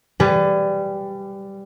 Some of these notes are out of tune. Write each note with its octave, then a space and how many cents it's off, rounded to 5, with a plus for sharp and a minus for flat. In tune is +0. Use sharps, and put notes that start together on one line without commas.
G3 +0 B4 +30 G#5 +0